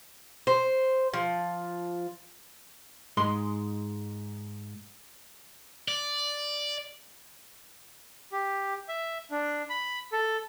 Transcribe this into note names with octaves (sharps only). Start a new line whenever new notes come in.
C5
F3
G#2 G#3 D#5 C6
D5
G4
E5
D4
B5
A4